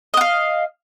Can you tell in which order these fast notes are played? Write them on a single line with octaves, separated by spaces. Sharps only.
D#5 F#5 F5